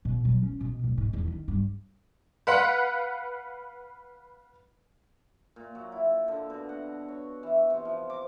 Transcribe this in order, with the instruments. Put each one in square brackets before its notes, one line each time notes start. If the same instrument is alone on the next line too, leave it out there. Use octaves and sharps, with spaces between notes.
[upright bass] B2
F#3
C#4
B2
D1
G#2
E2
D#3
G2
[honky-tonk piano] B4 F5 F#5 B5
[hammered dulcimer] A#2
F#3
E4
D3
B2
F#5
C#5
E3
C3
F3
D6